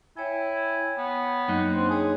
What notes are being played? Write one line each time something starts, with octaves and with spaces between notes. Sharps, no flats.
E4 C#5 G5 G#5
B3
F#2 A#3 D#4 F#5
C4 D4
G#4 C#5 A5